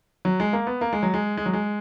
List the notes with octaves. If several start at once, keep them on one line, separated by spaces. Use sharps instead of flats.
F#3
G#3
A#3
B3
A#3
G#3
F#3
G#3
G#3
F#3
G#3